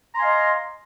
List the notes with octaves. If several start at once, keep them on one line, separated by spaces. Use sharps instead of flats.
D#5 F5 G#5 A#5 C6